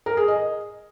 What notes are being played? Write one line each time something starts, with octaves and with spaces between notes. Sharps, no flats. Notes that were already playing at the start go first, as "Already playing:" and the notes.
A#4
G#4
D#5